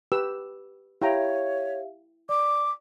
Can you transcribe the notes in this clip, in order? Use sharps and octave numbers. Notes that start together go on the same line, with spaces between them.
G4 B4 E6
E4 G4 C#5 E5 F5 G5 A#5
D5 D6